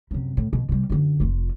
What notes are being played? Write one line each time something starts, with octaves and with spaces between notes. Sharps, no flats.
F#2 C3
A2
B2
C3 G3
F#2 D3
F1 F4